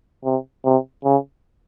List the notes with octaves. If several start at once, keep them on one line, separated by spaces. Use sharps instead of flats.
C3
C3
C#3